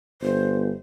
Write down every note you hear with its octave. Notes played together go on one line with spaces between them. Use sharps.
G1 C5